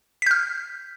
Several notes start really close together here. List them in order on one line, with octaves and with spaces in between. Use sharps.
B6 G6 F6